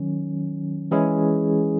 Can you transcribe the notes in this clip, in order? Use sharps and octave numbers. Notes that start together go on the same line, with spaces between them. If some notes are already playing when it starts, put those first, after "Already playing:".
Already playing: D#3 F#3 C#4
E3 G#3 C#4 E4 G#4